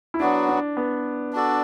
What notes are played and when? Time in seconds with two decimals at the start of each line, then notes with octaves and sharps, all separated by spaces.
0.14 E4
0.20 F#3 B3 D4 F#4
0.49 D4
0.77 B3
1.33 D4 F#4 A4 D5